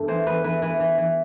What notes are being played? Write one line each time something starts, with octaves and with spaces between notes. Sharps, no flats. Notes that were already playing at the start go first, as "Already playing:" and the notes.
Already playing: E2 G2 A4
E3 C5
E2 B4
E3 B4
E3 B4
E3
E3